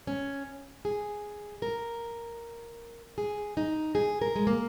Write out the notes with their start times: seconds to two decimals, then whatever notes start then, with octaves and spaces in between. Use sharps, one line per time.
0.07 C#4
0.85 G#4
1.62 A#4
3.18 G#4
3.57 D#4
3.95 G#4
4.21 A#4
4.36 G#3
4.47 A#3